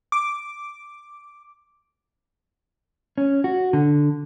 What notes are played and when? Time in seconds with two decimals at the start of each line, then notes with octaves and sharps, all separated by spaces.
0.12 D6
3.18 C#4
3.44 F#4
3.73 D3